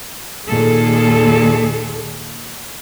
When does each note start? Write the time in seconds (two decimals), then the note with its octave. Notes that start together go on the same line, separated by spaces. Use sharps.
0.46 D#2 A#2 G#4 A4